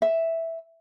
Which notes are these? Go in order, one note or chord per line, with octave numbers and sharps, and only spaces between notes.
E5